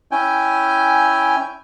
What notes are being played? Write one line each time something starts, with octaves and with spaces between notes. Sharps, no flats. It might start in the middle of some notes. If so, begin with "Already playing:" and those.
C#4 E4 G5 G#5